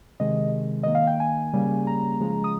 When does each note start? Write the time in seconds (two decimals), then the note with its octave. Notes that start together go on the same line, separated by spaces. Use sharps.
0.20 C3 D#3 G#3 D#5
0.83 D#3 A#3 D#5
0.95 F5
1.07 G5
1.20 G#5
1.53 C#3 G3 A#3
1.87 A#5
2.20 C#3 F3 G#3
2.44 D#6